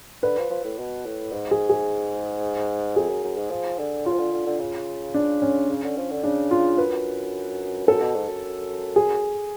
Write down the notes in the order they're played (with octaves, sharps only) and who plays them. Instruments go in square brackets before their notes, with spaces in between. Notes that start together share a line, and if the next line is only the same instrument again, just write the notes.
[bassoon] D3 [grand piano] B4
[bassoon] F3
F3
A2
B2
A2
G#2
[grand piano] G#4
G#4
[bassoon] F2 [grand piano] G#4
[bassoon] F#2
F#2
G#2
F3
D3
[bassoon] C#3 [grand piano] F4
[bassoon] F3
D3
D3
D3
C#3
[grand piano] D4
C#4
[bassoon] C#3
D3
F3
D3
[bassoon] C#3 [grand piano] D4
[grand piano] F4
[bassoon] F#2 [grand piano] B4
[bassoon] F#2 [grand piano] A4
[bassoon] B2
G#2
F#2
[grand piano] G#4